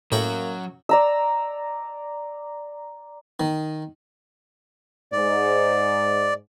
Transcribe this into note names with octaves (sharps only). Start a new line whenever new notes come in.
F#2 A2 F#3 A#3 F#4 G5
D5 A#5 E6
D#3
G#2 D5